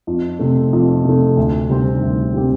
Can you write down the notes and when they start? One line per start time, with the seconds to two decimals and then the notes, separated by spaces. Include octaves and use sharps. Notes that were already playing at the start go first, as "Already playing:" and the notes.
0.07 F2
0.39 C3 A3
0.73 F2
1.05 C3 A3
1.37 D2
1.69 C3 G3 C4 G4
2.02 D2
2.34 C3 G3 C4 G4